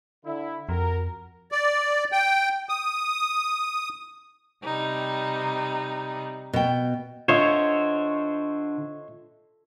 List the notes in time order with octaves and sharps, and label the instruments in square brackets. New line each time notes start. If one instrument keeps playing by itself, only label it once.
[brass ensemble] D3 E4
[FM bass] F2 [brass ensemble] F#4 A#4
[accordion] D5
G5
D#6
[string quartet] C3 G3 D#4
[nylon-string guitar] B2 G5
[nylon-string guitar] D3 [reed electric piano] F4 D#5 E5 [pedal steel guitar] C5 C#5